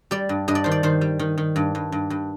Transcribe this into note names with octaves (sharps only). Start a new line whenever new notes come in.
G3 D5
G2
G2 D#5
D5
D#3 C5
D5
D#3 C5
G3
D#3
D#3
G2
G2
G2
G2